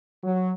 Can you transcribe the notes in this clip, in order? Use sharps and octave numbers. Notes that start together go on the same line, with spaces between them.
F#3